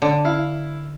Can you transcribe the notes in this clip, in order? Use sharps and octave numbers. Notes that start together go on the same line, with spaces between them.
D3
E4 F5